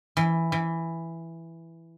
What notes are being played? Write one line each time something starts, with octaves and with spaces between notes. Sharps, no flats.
E3
E3